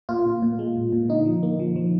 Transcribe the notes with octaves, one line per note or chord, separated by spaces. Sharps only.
A#2 F4
A#2
A#2
G#3
A#2
A#2
D3 D#4
F3
A#3
F3
F3